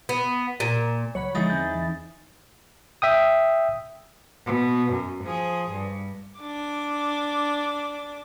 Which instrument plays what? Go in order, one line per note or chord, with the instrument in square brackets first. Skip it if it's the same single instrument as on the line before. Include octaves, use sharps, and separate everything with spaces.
[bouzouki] B3
A#2
[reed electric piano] C#2 F#3 [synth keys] C#5 F#5 B5
[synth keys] E2 A6 [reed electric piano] D3 F3 G#3 [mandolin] D#4 E4 G#4
[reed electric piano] C4 G6
E3
[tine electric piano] E5 G5 D#6
[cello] B2
F#2
F3 G#4
G2
[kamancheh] D4 D6